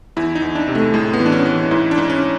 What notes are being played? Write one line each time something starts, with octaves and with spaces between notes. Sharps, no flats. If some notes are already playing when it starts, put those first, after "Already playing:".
E2 E4
D#4
E2
D4
C3
A3
A2 G#3
B3
E3
D4
C#4
E3
G#2 E4
D4
G#2
C#4